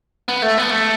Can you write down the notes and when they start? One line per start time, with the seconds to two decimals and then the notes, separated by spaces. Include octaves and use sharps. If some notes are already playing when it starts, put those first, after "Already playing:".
0.29 B3
0.43 A3
0.58 B3
0.71 A3